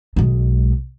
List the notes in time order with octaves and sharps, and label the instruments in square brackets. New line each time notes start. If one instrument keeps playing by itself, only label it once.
[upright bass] B1 G#3